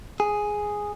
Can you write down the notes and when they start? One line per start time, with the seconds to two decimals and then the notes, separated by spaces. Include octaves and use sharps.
0.20 G#4